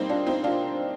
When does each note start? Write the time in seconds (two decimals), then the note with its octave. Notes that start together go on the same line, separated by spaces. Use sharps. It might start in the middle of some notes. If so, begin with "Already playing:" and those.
Already playing: G3 A#3 C4 D#4
0.09 D4 F4
0.27 C4 D#4
0.44 D4 F4